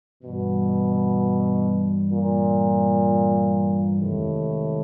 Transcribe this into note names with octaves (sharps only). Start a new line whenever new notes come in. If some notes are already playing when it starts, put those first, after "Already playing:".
G2 B2 E3 G3
A#2
F2 A2 C3 D#3 G#3